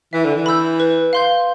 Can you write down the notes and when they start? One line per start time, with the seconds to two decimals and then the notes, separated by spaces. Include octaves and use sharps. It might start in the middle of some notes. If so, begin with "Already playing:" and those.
0.13 E3 E5
0.25 D3
0.36 E3
0.46 B5 E6 G6
0.80 B4
1.13 F5 C6 G6